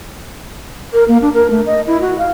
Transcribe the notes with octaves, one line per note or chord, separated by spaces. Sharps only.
A#4
A#3
D4
A#4
A3
D#5
E4
F#4
F5